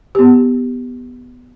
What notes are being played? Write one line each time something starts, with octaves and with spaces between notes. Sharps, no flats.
B3 G4